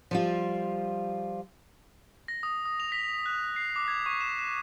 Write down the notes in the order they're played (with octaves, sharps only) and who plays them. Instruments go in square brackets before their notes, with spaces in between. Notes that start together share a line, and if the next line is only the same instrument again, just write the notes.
[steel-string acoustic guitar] F3 G3 F4
[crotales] A#6
D#6
D#6
F7
B6
F#6
C7
D6
G#6
C#6
E7
E7